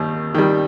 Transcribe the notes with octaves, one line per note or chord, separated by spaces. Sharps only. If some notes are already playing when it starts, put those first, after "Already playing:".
Already playing: D#2 D#3 G3
D#3 G3